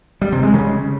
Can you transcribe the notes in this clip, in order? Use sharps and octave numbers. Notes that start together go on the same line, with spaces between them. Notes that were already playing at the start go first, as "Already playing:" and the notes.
G3
C3
G#3
C#3